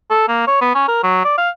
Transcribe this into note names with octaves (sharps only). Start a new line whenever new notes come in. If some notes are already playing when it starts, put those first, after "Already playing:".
A4
A#3
C#5
B3
C#4
A#4
F#3
D5
F5